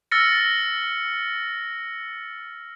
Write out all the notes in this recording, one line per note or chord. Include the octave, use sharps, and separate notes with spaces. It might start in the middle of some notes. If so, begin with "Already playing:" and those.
E6 F6 A6 A#6 C#7